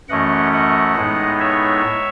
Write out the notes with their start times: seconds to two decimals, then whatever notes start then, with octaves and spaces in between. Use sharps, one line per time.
0.09 F#2 E3 A3 C#4 D#5 F#5
0.53 D#5 F#5
0.96 A2 G#3 B3 D#4
1.39 C#5 E5